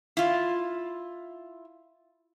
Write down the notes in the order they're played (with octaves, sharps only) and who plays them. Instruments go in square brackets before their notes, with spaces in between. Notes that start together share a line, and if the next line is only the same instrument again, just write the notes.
[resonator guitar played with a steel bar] E4 F4